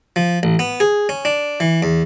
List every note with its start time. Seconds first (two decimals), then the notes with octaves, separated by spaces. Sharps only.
0.16 F3
0.43 A1
0.59 B3
0.80 G#4
1.09 C#4
1.25 D4
1.60 E3
1.83 E2